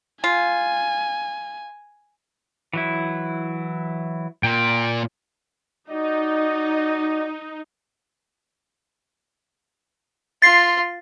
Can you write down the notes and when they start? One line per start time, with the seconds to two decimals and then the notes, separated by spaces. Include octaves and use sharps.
0.24 F4 G#5
2.73 E3 F#3 E4
4.43 A#2 G5
5.90 D#4 F#4 D5 D#5
10.42 F4 C6 A6 C7